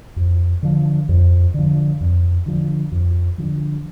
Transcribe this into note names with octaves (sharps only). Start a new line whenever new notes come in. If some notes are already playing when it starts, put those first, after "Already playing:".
F2
D3 F3
F2
D3 F3
F2
D3 F3
F2
D3 F3